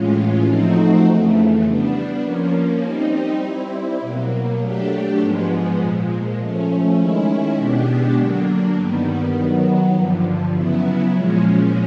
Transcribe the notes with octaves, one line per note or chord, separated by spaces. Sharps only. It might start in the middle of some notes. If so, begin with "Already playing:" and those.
Already playing: A2 E3 G#3 C#4 F4
F3 A3 C4 D#4 F#4
F2 C#3 E3 A3
G3 B3 D4
F3 A#3 C#4
G3 C4 D#4
G3 C4 E4
B2 F#3 A#3
F#3 A3 D4 G4
G#2 F3 G#3 B3
A#2 F3 G#3
F3 A3 C#4
D#3 G#3 C#4 E4
B2 G#3 B3 D4 G4
D3 F#3 A#3 D4
G2 D#3 G3 B3
D#3 F#3 B3
G2 D3 F3
C#3 F#3 B3 E4
A#2 F3 G#3 C#4